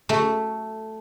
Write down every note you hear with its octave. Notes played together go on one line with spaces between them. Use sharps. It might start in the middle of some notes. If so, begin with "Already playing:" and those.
A3